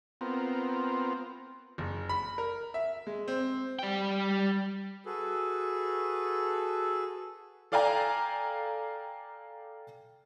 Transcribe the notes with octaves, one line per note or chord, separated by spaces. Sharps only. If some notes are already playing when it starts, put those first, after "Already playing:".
B3 C4 F4 A#4
F#1
B5
A#4
E5
G#3
C4
G3 G5
F#4 G#4 A4 B4
A4 D5 F5 G5 G#5 A#5